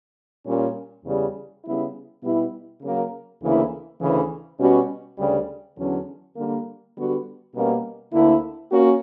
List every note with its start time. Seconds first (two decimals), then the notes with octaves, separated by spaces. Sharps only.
0.45 A#2 G3 C#4
1.05 E2 C#3 G3
1.63 C#3 G3 B3 E4
2.22 B2 G3 B3 E4 G4
2.81 C#3 F#3 A#3
3.41 D2 C#3 E3 A#3 E4
4.00 D2 C#3 E3
4.59 B2 G3 C#4 F#4
5.17 D2 C#3 G3
5.76 E2 D3 F#3 C#4
6.36 D3 G3 A#3
6.95 D3 G3 B3 F#4
7.53 B2 G3 A#3 C#4
8.13 D2 D3 A#3 E4
8.71 A#3 C#4 F#4